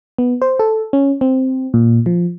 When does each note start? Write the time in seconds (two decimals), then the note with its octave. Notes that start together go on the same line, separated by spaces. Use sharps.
0.18 B3
0.42 C5
0.59 A4
0.93 C#4
1.21 C4
1.74 A#2
2.06 F3